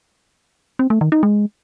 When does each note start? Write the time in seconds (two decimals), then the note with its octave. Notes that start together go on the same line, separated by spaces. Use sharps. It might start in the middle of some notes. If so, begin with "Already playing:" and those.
0.79 C4
0.90 A3
1.01 D#3
1.12 D#4
1.23 G#3